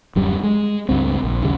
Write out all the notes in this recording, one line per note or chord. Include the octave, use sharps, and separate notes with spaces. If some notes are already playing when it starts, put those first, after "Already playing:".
D1 F#2 G3
G#3
C#2 G2 C4
A#1
D#2 C#3 G3